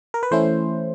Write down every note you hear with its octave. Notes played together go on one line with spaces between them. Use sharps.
A#4
B4
E3 A3 C#4 E4 C5